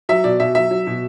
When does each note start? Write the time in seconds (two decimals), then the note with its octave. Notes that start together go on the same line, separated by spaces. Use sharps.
0.09 F#3 E5
0.24 B2 D5
0.40 B2 E5
0.55 F#3 E5
0.71 F#3
0.87 B2